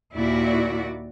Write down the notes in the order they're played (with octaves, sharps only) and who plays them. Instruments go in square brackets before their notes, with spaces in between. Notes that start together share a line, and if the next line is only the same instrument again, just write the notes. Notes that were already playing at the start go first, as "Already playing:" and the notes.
[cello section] D#2 A#2 E4 F#4 D5